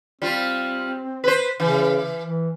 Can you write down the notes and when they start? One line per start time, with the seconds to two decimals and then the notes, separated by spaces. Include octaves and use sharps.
0.22 G3 C4 F4
1.24 B4 C5
1.60 C#3 E3
2.23 E3